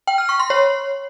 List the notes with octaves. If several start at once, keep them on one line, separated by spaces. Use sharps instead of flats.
G5
F6
C#6
C6
C#5